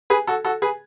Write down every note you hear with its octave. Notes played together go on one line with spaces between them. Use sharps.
G#4 B4
F#4 A4
F#4 A4
G#4 B4